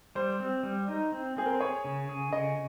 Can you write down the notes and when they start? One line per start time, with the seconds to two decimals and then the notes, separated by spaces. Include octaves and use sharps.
0.15 G3 C5
0.40 C4
0.63 G3
0.88 D#4
1.12 C4
1.37 C4 G#4
1.46 A#4
1.53 C5
1.60 G#4 C#5
1.85 C#3
2.09 G#4
2.33 C#3 D#5